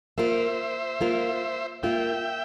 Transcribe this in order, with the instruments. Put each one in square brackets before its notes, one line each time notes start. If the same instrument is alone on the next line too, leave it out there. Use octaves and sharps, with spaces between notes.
[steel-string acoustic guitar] A#3 F4 A#4 [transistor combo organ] C5 E5
[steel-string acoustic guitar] A#3 F4 A#4
[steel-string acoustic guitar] A#3 F4 A#4 [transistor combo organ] E5 G5